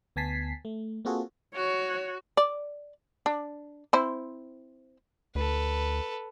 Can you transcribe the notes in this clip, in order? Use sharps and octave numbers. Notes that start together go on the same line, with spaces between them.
D2 B3 G#5 A5 B6 C7
A3
A#3 C4 F4 F#4 G#4 A4
F#4 C#5
D5
D4
C4 E4 C5
D2 A4 B4